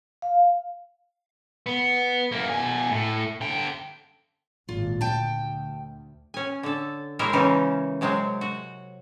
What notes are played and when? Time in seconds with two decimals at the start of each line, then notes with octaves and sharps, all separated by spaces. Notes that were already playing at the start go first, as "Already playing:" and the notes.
0.22 F5
1.66 B3
2.32 F#2 A#3
2.49 B2 G#5
2.91 A2
3.41 D3 G5
4.69 G#1 A#2 F4
5.01 D2 G5 A5
6.34 C#4 G#5
6.63 D3 A4
7.19 G#3 A#3 E4 A#4 C5 C#5
7.33 C#3 E3 C4 C#4 D#4
8.01 C3 F#3 G#3 C4
8.41 F#4